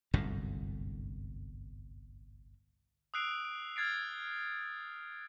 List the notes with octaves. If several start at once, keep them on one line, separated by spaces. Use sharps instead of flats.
G1 C2 F#2 A2
D#6 E6 F#6 C7 D7 F7
D7
F6 G#6 A6 C7 D7